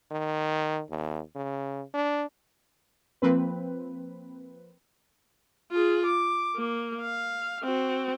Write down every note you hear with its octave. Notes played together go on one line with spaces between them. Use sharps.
D#3
D#2
C#3
D4
F3 A#3 C4 B4
F4 G#4
D6
A#3
F5
C4 F#4